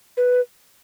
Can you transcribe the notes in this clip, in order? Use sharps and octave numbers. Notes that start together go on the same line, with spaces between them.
B4